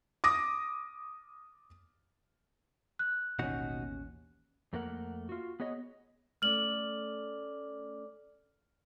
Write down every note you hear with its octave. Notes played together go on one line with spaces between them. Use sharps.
D6 D#6 A#6
F#6
A1 D#2 B2 C#4 D#4 F#4
F2 A3 A#3 A#4 F#5
F4 F#4
B3 G#4 C#5 D#5
A3 C#4 A4 D5 D6 F6 F#7